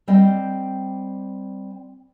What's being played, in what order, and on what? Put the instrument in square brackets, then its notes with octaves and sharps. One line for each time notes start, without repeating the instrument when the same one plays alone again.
[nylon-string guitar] G3 C4 D5 D#5 G5